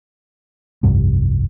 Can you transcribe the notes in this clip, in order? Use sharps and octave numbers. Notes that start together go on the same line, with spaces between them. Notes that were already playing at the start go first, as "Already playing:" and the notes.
F1 C2 G2 C3